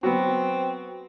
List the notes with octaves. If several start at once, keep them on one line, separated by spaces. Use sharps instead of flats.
F#3 B3 C4